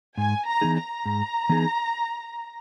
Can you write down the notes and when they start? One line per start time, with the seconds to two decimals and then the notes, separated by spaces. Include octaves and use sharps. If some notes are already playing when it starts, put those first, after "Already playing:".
0.17 G#2 G#5
0.47 A#5
0.61 E3 B3 D#4 G#4
0.76 A#5
1.06 G#2
1.49 E3 B3 D#4 G#4